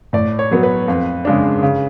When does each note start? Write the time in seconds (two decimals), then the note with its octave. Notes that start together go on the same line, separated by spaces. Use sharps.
0.13 A2 D5
0.39 C#5
0.51 F#3 B3
0.63 B4
0.88 F2
1.25 C#3 G#3 D4
1.63 C#3